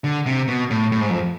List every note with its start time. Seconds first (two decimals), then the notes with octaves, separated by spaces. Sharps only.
0.04 D3
0.26 C3
0.48 B2
0.70 A2
0.92 A2
1.01 G#2
1.10 F2